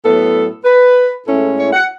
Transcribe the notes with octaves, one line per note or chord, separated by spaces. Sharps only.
A2 F#3 B3 A4
B4
A2 G#3 C#4 E4 A4
C#5
F#5